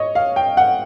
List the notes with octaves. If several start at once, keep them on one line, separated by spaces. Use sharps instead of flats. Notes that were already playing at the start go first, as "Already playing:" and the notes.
Already playing: C#5 D#5
F5
G5
F#5